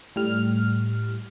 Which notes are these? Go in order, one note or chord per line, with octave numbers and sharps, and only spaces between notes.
A2 G3 F6